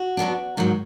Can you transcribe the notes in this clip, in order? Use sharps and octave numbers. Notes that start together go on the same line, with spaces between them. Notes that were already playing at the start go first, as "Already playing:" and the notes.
Already playing: F#4
B2 F#3 B3 D4
G#2 D#3 F#3